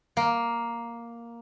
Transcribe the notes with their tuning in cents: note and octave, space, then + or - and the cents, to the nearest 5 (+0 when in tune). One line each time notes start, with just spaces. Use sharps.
A#3 +5